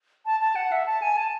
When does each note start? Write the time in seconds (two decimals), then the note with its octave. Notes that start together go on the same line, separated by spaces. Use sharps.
0.26 A5
0.41 A5
0.56 F#5
0.72 E5
0.86 A5
1.02 G#5
1.17 A5